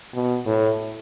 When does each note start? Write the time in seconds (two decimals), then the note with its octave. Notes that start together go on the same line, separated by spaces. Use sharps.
0.14 B2
0.46 A2